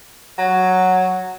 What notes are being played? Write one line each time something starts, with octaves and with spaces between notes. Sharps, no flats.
F#3